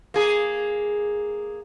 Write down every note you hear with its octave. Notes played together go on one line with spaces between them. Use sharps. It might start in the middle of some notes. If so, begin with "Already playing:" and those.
A#3 G#4